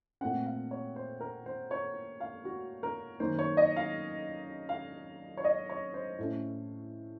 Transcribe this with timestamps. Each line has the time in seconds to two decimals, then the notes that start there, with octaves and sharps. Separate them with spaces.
0.21 A#2 A3 C4 F#5
0.46 F5
0.71 C#5
0.96 C5
1.21 A#4
1.46 C5
1.71 C#5
2.20 F5
2.45 F#4
2.83 A#4
3.20 F#2 D#3 A#3 C#4 C5
3.39 C#5
3.57 D#5
3.76 F5
4.69 F5
5.37 C#5
5.44 D#5
5.69 C#5
5.94 C5
6.18 A2 A3 C#4